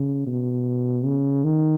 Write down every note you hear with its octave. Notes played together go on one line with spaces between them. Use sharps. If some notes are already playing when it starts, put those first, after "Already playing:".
Already playing: C#3
B2
C#3
D#3